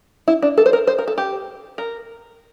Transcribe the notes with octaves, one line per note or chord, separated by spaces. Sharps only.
E4
D4
A4
C5
A#4
C5
A#4
A4
G4
A#4